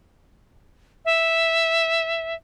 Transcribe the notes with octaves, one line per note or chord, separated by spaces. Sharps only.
E5